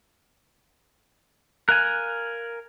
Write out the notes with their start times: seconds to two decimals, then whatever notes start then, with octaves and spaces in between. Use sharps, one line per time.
1.69 A#4 F5 G#5 F#6